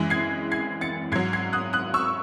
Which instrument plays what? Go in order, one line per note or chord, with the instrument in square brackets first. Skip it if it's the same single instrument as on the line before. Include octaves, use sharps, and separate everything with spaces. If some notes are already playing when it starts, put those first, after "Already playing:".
Already playing: [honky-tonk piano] F#2 E3 G#3
G#6 C7
G#6 C7
A6 C#7
G#2 G#6 C7
F#3
G#6 C7
D#6 F#6
D#6 F#6
C#6 E6